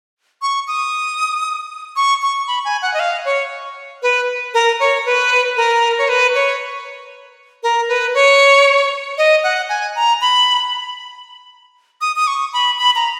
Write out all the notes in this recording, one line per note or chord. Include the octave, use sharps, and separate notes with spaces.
C#6
D#6
C#6
C#6
B5
G#5
F#5
D#5
F5
C#5
B4
A#4
C#5
B4
A#4
C#5
B4
C#5
A#4
B4
C#5
D#5
F#5
G#5
A#5
B5
D#6
D#6
C#6
B5
B5
A#5